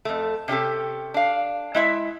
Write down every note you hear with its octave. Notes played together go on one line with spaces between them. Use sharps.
F2 A3
C3 C#4 G4 A4
D4 F5
G#3 E4 E5